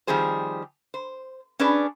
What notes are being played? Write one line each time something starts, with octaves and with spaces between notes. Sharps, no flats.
D#3 F3 G3 C4 G#4 C5
C5
C#4 D4 G#4 B4 D5